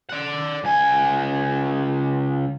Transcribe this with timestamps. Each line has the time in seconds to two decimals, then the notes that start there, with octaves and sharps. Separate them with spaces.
0.10 D5 F#5
0.64 C#2 G#5